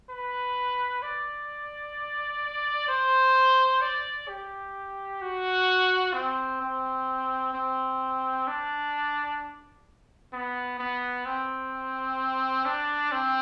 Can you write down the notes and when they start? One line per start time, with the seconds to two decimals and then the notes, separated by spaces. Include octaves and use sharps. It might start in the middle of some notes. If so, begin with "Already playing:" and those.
0.10 B4
1.02 D5
2.88 C5
3.81 D5
4.28 G4
5.22 F#4
6.14 C4
6.61 C4
7.53 C4
8.47 D4
10.33 B3
10.79 B3
11.25 C4
12.65 D4
13.12 C4